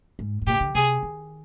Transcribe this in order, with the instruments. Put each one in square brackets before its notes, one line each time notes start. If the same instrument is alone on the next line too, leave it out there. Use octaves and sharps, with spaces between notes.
[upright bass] G#2
G#2
[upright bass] A#2 [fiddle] G4
[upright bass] D3
[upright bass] C3 [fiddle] G#4
[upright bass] D#3